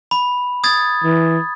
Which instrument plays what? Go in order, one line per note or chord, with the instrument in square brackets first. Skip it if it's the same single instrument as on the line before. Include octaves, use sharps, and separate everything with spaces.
[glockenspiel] B5
D#6 G#6 A6
[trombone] E3